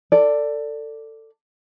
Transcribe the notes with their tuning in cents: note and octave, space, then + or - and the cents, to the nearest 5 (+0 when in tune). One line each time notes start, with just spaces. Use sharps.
A4 +25 D5 +0